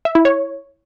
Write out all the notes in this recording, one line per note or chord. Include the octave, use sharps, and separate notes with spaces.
E5
E4
C#5